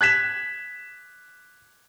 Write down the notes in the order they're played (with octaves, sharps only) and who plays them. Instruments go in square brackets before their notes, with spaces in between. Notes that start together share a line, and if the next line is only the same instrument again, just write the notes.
[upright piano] F#6 G#6 B6 E7